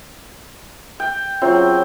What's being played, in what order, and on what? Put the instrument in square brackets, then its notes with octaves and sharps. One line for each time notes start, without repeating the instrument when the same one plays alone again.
[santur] G5
[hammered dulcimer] C#3 F#3 G5 [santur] C4 [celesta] F4 C#5 E5